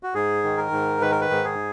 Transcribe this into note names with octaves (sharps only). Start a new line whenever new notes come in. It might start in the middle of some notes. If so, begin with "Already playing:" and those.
F#4
G#2 G#4
D#3
A#4
G#2
D#3 B4
A#4
B4
G#2
G#4